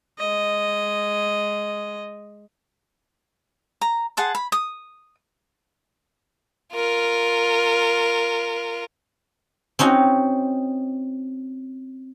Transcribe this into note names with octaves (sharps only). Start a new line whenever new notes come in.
G#3 D#5
A#5
G#4 F#5 A5 C6
B5
D#6
F4 A#4
C4 C#4 D#4 F#4